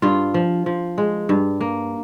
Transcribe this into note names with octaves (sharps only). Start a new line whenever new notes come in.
G2 F4
F3
F3
G#3
G2
A#3